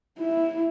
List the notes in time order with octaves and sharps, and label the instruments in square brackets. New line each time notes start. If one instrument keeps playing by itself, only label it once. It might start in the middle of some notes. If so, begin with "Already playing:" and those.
[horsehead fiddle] E4